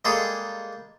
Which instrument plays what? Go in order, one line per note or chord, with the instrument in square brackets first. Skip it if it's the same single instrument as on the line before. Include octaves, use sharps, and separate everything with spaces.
[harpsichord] G3 G#3 A#3 G#4 A4